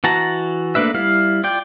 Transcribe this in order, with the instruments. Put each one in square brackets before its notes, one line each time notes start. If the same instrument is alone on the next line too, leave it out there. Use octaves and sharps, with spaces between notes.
[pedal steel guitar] E3 F#4 A5 A#5
A3 A#3 D4 B4 E5
G3 E4 F5
F4 D5 G5